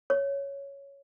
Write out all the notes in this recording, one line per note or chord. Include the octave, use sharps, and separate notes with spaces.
C#5